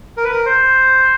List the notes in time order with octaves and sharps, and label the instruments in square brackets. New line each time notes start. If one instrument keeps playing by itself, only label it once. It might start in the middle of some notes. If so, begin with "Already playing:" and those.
[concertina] A#4
B4
A#4
C5